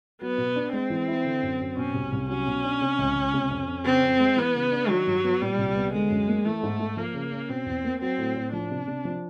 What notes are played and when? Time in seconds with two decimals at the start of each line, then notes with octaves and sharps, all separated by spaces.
0.21 F#3 B3
0.38 B2
0.56 D4
0.73 G#3 C4
0.90 E3
1.08 E4
1.25 D3
1.43 F#2
1.60 F#2
1.77 B2 C#4
1.94 C2
2.12 C2
2.29 F#3 C#4
2.47 B2
2.63 D4
2.81 C3
2.98 C#2
3.15 C#2
3.34 C3
3.50 F2
3.68 F2
3.85 C#3 C4
4.03 F2
4.19 G#3
4.37 E3 B3
4.54 C#3
4.72 D4
4.89 D#3 F#3
5.07 G2
5.24 B3
5.41 A#2 G3
5.58 C2
5.76 B3
5.93 D3 G#3
6.10 F#2
6.28 A#3
6.45 E3 A3
6.63 G#2
6.79 G#2
6.97 F3 A#3
7.14 C#3
7.32 C#4
7.49 B2 C4
7.66 E2
7.84 A#3
8.01 F#3 C4
8.18 A2
8.36 A2
8.53 F3 D4
8.71 C3
8.87 C3
9.05 F3